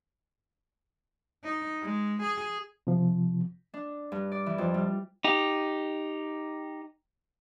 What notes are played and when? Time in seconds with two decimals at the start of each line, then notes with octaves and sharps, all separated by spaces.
1.44 D#4
1.81 G#3
2.23 G#4
2.87 C3 F3
3.74 D4
4.12 G2
4.32 D5
4.46 E3
4.58 F2
4.74 G3
5.24 D#4 G4